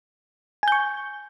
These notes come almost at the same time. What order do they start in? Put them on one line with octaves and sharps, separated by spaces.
G#5 G6 C#6